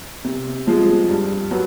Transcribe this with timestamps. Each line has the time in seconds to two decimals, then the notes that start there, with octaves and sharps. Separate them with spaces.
0.24 C3
0.67 F3 G#3
1.09 G2
1.51 F#3 B3